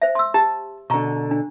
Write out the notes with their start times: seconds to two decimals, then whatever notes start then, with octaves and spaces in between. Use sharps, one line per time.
0.02 C5 E5
0.15 C6 E6
0.34 G4 A5
0.90 B2 D3 A#5 C#6
1.31 D4